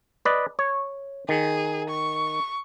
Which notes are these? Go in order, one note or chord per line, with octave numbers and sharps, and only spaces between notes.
B4 D5 D#5
C#5
D#3 G#4
C#6